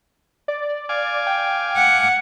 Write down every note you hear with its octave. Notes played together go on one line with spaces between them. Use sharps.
D5
F5 G#5 D6
G5
F#5